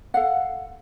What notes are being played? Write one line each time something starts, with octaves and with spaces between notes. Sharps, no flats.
A4 F5 F#5